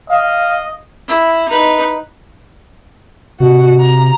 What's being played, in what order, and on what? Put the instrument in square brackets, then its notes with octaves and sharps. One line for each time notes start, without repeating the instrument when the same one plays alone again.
[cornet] D#5 [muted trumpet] F5
[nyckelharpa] E4
D#4 B4
[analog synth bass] C3 [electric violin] F#4
[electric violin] A#5